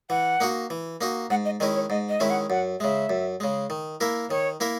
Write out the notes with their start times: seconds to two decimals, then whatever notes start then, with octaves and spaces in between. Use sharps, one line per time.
0.10 E3 F#5
0.40 A#3 D#4 F#4
0.70 E3
1.01 A#3 D#4 F#4
1.30 G#2 F#5
1.45 D#5
1.60 D#3 G#3 C#4 E4 D#5
1.75 C#5
1.90 G#2 D#5
2.09 D#5
2.20 D#3 G#3 C#4 E4 E5
2.30 F#5
2.50 F#2 F#5
2.80 C#3 G#3 E5
3.10 F#2
3.40 C#3 G#3
3.70 D#3
4.01 A#3 E4 A#4 E5
4.30 D#3 C#5
4.60 A#3 E4 A#4 E5